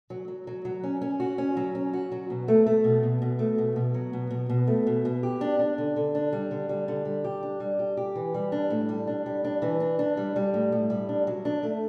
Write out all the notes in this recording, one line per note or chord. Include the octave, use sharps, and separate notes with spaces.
F#3
F#3
F#3
F#3
C#4
C#4
F#4
C#4
F#3
C#4
F#4
F#3
B2
A3
A3
B2
B2
B2
A3
B2
B2
F#3
B2
B2
B2
A3
B2
B2
G4
D4
D4
D3
D3
D4
G3
D3
G3
D3
G3
G4
D4
G3
G4
G4
E3
G3
D4
A2
G3
D4
G3
D4
E3
D4
D4
G3
G3
A2
A2
G3
D4
F#3
D4
A3